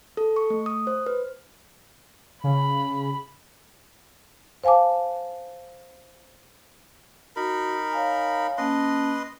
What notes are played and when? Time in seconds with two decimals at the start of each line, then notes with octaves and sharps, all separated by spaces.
0.17 A4
0.36 C#6
0.50 A3
0.66 D#6
0.87 C5
1.06 B4
2.44 C#3 B5
4.64 C5 F5 G#5 A5 D6
7.36 D#4 F#4 A#4 B5
7.92 C#5 F5 G#5
8.58 A#3 C#4 B4 D#5 A5 C6